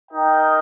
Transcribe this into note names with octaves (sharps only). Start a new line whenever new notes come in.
D#4 A#4 D#5 G5